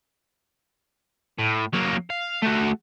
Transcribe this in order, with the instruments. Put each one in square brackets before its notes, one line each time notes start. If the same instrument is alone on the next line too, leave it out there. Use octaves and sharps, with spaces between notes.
[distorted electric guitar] A2
F#3 A#3
F5
A3 F#4